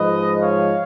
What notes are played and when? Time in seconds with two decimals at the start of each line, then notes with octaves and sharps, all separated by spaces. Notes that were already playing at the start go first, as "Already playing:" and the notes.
Already playing: G#2 F3 G#3 B4 D#5
0.40 C#5 F5